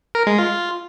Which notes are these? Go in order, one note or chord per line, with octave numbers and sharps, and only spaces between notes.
A#4
G#3
F4